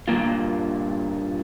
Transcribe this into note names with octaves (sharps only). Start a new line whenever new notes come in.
G2 A#2 D#3 A#3 F4